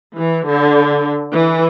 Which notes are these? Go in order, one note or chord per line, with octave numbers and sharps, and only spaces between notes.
E3
D3
E3